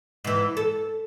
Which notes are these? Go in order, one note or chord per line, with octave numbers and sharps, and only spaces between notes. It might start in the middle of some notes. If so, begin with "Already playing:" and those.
G#2 E3
A4